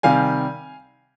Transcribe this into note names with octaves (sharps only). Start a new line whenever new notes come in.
C3 D#3 G3 F5 G#5